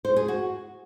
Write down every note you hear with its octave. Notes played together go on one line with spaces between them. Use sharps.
C5
G#4
F#4